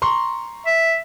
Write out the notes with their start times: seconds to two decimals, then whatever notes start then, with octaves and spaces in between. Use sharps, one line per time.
0.02 A#5 C6 C#6
0.67 E5